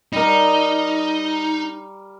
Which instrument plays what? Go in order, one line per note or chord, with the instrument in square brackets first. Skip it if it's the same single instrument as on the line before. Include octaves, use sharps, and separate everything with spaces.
[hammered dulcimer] G3 A#4 [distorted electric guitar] D#4